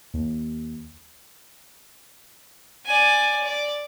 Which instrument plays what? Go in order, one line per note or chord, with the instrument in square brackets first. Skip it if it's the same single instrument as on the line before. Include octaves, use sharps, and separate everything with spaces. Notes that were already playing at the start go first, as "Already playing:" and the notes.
[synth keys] D#2
[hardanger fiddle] D5 G#5
D5